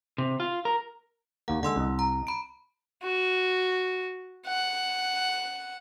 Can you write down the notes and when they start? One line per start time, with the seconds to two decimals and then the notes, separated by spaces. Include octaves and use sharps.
0.18 C3
0.40 F4
0.65 A#4
1.48 D#2 A#3 F#5
1.63 D3 G#3 F#5 C6 E6
1.76 C2 D#5
1.99 A#5
2.27 B5 D7
3.03 F#4
4.47 F#5